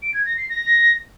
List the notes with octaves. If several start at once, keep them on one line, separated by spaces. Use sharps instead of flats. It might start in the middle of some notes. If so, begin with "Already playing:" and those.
D7
G#6
A#6
C7
A#6